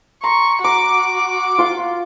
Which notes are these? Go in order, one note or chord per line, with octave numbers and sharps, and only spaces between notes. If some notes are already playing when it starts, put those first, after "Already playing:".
A#5 C6 C#6
F#4 A#5 C6 D6
F4 C6